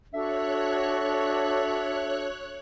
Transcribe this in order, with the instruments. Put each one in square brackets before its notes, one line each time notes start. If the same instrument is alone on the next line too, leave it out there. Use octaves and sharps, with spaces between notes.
[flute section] D4 F#4 A4 [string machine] C#5 F#6 [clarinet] E5